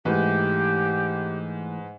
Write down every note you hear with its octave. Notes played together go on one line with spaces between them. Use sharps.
G#2 E3 A3 E4 G4 B4